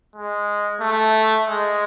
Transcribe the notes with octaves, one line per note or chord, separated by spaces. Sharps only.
G#3
A3
G#3